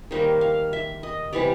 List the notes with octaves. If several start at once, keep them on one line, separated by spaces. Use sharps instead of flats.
D#3 G3 A#3 C5
F5
E5
D#5
C3 E3 G3 D5